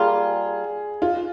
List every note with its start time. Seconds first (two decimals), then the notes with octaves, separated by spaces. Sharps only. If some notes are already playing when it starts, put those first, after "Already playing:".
Already playing: G3 A#3 F4 G#4
1.02 F4